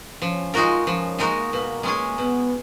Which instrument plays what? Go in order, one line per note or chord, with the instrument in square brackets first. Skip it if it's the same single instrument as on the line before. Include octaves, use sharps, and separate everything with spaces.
[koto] F3 [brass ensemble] C#4
[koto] G#3 D#4 F#4 A#4 [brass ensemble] F4
[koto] F3 [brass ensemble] C#4
[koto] G#3 D#4 F#4 A#4 [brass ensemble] A#3
[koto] B2 [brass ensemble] A#3
[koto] G#3 C#4 G#4
[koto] B2 [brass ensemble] B3